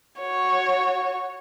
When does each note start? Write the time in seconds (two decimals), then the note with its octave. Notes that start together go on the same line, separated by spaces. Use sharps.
0.20 F#4 C#5